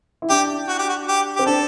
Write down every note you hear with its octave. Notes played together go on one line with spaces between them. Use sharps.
E4
D4 G4
F#4
G4
F#4
G4
C4 G4
D4 A4